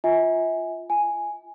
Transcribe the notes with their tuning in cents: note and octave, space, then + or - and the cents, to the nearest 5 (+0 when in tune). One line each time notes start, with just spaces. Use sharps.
F4 +0 E5 -40 G#5 +0
F4 -35 G#5 +0